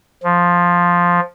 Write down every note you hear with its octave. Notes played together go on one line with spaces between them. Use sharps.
F3